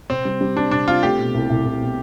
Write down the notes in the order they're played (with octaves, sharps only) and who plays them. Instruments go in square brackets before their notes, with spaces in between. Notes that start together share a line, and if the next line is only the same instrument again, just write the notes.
[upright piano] C3 [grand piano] C4
[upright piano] G3
G3
[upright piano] G3 [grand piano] D4
[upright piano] C3 [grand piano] D4
[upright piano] C4 [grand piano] F4
[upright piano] A3 [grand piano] G4
[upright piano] B2
C2
C2
C2
B2